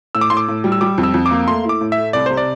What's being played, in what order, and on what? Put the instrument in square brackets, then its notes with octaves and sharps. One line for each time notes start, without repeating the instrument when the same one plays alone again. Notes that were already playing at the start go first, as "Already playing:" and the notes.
[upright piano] A2 [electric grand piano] E6
[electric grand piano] D6
[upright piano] A2 [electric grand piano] C6
[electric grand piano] D6
[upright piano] A2
G3
[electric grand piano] E6
[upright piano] G3 [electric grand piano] D6
[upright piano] F2
[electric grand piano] E6
[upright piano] F2
[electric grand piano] D6
[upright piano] A#3
[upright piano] A3 [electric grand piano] C6
[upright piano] E4
[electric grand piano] D6
[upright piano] A2
[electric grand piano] E5
[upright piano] A3
[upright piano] C2 [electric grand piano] D5
[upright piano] C3 [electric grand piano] C5
[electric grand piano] D5